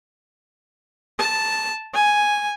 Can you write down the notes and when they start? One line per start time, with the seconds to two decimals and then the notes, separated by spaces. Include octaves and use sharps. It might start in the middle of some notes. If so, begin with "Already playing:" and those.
1.19 A5
1.94 G#5